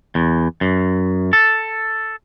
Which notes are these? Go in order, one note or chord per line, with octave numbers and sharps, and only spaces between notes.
E2
F#2
A4